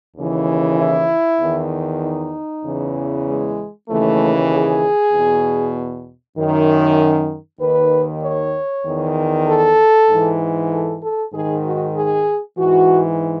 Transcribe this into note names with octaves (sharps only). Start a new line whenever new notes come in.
D#2 C#3 E3
E4
E2 D#3
D#4
E2 C#3 E3
G#3
D#2 C#3 E3 A3
G#4
E2 B2
F#2 D#3
D#2 D#3 B4
C#5
E2 D#3
A4
G#2 E3
A4
A4
G#2 D#3 G#4
F#4
G#4
G#2 E3 F#4